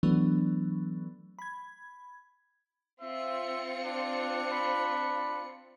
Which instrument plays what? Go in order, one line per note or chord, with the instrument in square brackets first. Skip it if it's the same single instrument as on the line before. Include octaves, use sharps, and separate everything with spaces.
[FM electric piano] E3 F#3 A3 B3 D4
B5 G#6
[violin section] C4 F4 C#7 [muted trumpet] E5
[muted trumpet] D4
[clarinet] B5